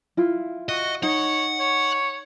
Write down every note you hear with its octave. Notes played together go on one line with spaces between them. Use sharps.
E4 F4
F#4 D#5
D#4 C#5 F#5
C#5